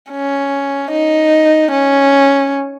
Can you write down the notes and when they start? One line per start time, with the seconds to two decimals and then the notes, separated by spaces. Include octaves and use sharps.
0.12 C#4
0.92 D#4
1.71 C#4